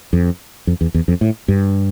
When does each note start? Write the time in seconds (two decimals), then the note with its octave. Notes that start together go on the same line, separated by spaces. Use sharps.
0.13 F2
0.67 F2
0.81 E2
0.94 E2
1.08 F2
1.21 A2
1.48 G2